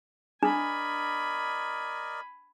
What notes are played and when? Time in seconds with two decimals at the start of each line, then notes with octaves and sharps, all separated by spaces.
0.43 D4 A#4 D5 D#5 G#5 B5